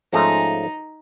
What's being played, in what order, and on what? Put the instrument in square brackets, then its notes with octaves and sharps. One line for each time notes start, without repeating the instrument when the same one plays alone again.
[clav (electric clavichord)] G#2 F3 A3 C#4 [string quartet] D#4